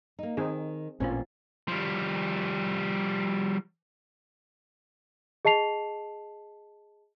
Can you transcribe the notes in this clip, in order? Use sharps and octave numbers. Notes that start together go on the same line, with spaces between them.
A#3 D#4
D#3 C4 D#4 G#4
A1 A#2 C4 C#4 F4
F3 G3
G#4 D#5 A5 C7 F7